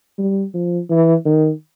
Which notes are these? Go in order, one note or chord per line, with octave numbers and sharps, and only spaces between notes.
G3
F3
E3
D#3